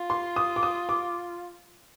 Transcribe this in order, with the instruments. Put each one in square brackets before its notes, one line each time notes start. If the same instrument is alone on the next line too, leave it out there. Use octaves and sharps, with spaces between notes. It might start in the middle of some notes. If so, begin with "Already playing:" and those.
Already playing: [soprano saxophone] F4
[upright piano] C6
D#6
D6
D#6
D6